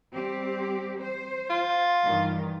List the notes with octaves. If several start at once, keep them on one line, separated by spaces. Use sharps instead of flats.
G3 C4 G4
C5
F4
G2 D#3 E3